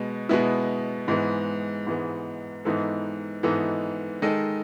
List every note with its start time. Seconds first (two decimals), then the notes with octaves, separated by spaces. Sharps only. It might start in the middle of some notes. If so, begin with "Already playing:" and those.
Already playing: B2 G#3 B3
0.29 B2 G#3 B3 E4
1.08 G#2 E3 G#3 B3
1.87 G#2 E3 G#3 B3
2.65 G#2 E3 B3 D#4 A4
3.43 G#2 E3 B3 D#4 A4
4.22 D#3 G#3 D#4 A4 D#5